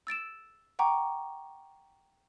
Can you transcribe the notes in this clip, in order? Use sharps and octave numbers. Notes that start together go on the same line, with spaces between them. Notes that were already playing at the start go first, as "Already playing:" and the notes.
E6 A6 D7 E7
F#5 G5 A#5 C#6 D6